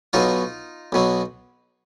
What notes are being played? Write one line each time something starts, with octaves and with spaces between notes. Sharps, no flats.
B1 B2 F#3 D#4 F4
B1 B2 F#3